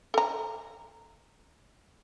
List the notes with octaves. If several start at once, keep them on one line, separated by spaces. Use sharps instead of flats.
A4 A#5